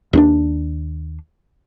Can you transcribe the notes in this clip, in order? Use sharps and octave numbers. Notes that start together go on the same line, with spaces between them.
D#2 C4 D4